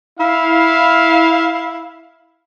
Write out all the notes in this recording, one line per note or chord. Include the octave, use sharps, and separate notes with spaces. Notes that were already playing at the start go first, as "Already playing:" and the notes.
E4 F5